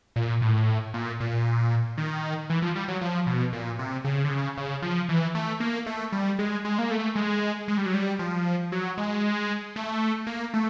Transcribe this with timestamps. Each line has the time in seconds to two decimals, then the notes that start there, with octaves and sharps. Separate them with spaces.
0.16 A#2
0.42 A2
0.94 A#2
1.20 A#2
1.98 D#3
2.50 E3
2.62 F3
2.76 G3
2.88 F#3
3.02 F3
3.27 B2
3.53 A#2
3.79 C3
4.05 C#3
4.24 D3
4.30 C#3
4.57 C#3
4.82 F3
5.09 E3
5.35 A3
5.60 A#3
5.86 A3
6.12 G3
6.39 G#3
6.65 G#3
6.79 A#3
6.91 A3
7.16 G#3
7.68 G#3
7.77 G3
7.86 F#3
7.95 G3
8.19 F3
8.72 F#3
8.98 G#3
9.76 A3
10.27 A#3
10.54 A3